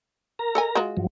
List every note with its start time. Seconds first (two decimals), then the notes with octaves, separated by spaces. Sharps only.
0.39 A#4 A#5
0.55 A4 D#5 G#5
0.75 G#3 F4 F#4
0.97 G2 F3 F#3